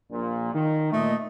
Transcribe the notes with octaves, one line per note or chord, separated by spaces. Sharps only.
A#1 A#2
D#3
A#2 A3 D#5